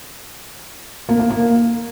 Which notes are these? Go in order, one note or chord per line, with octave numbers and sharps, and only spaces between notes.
A#3
A#3
A#3